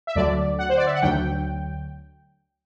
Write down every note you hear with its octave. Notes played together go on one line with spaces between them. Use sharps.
E5
D2 D3 F#3 D5
F#5
C5
D5
E5
F#5
D2 D3 F#3 G5